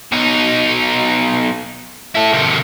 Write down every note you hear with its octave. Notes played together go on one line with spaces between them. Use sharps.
B2 D#4
E4 A4
C3 D#3